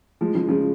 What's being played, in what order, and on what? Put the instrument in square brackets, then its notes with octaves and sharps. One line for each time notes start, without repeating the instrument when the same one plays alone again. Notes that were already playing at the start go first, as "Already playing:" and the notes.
[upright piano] F3 G#3
C#3 F3
C#3 F3